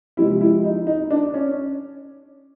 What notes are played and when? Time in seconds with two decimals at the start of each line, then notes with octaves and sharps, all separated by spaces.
0.17 C3 F3 G#3 E4
0.41 E4
0.64 D#4
0.87 D#4
1.10 D4
1.34 C#4